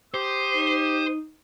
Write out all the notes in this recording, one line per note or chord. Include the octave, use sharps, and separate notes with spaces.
G4 C5 D#6
D#4